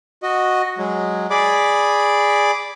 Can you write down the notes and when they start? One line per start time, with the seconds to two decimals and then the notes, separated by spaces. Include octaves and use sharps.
0.23 F#4 D#5
0.78 F#3 G#3
1.31 G#4 D5 B5 D6